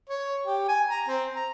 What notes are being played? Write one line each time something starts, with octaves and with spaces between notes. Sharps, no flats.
C#5
G4
G#5
A#5
C4
A#5